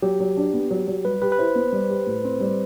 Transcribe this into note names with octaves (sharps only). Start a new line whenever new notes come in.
F#3 G4
F#3
D4
B3
F#3
F#3
G3 B4
G4 B4
B4
E4 C5
B3
G3
G4
A2
C4
G3